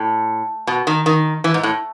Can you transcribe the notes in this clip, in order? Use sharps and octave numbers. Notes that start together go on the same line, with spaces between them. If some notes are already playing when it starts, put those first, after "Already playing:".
Already playing: A2
B2
D#3
D#3
E3
G#2
A2